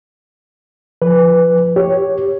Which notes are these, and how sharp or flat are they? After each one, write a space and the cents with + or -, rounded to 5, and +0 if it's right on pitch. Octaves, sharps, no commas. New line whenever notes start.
F3 +0 B4 +5
G4 +0 C#5 +0